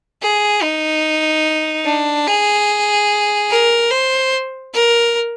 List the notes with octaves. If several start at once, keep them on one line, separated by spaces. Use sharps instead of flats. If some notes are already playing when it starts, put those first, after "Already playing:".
G#4
D#4
D4
G#4
A#4
C5
A#4